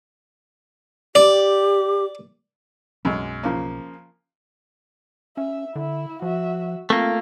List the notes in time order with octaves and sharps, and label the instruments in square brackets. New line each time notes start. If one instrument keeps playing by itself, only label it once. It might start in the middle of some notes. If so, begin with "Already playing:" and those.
[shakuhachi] G4 [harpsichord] D5
[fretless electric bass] B1 [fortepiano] F#2 G#3
[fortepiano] C#3 F3 A#3
[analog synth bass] C#4 [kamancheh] E5
[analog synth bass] D3 [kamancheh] E4 E5
[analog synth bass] F3 [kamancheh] F#4 E5
[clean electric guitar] A3 A#3 [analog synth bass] C4 [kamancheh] F4